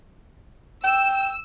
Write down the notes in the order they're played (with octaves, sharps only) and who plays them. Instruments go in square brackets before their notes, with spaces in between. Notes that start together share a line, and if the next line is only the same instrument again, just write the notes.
[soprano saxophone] G5 [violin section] E6